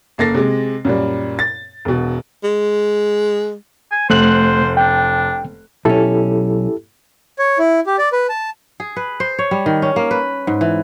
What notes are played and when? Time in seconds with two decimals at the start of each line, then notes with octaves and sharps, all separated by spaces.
0.18 F#1 A#3 A4 A6 A#6 C7
0.34 C3 G#3
0.85 F#2 A#2 G3
1.39 A6
1.85 E1 B2
2.44 G#3
3.92 G#5
4.10 F1 A3 C5 F#6 F#7
4.77 D4 G5
5.85 B1 C#4 E4 G4 A4
7.39 C#5
7.59 E4
7.86 G4
7.98 D5
8.12 B4
8.29 A5
8.80 G#4
8.96 B4
9.20 C5
9.39 C#5
9.51 G3
9.66 D#3
9.82 C#4
9.96 A#3
10.11 B4
10.47 G#2
10.61 E3